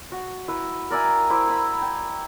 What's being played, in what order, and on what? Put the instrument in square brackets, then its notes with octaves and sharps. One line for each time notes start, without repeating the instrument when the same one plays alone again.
[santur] F#4
E4 B4
A#4 D5 E5 G#5
E4 C5 D6
A#5 B5
G5